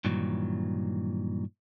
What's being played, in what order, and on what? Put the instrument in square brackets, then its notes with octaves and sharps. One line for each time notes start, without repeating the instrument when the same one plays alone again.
[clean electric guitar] G2 A#2 D#3 E3 F#3